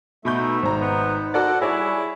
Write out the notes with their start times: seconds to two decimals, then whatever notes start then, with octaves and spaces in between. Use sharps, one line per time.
0.25 B2 A3 B3 D#4 E5 B5 G6
0.63 G#1 D#4 C5 A#5
0.81 B3
1.34 F#4 A4 D5 F#5
1.61 G3 E4 G#4 C#5 D5